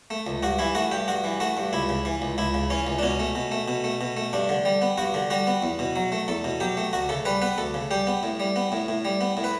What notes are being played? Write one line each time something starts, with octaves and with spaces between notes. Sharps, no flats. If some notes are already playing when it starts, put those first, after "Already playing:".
A3
C#2
G2 F#4
E3 E4
A3 F#4
G2 G4
G2 F#4
E3
A3 F#4
G2
C#2 E4
C#3
E3
C#2
C#2 E4
C#3
E3 C#4
C#2
D4
B2 C#4
A3
B2
A3
B2
A3
B2
A3
G2 D4
D3
G3
B3
G2 F#4
D3
G3 F#4
B3
E2
B2
F#3
A3
E2 A4
B2
F#3 G4
A3
D2 F#4
C#3 A4
G3 B4
B3 B4
D2 A4
C#3
G3 G4
B3
A2
G3
B3
A2
A2
G3
B3
A2
B4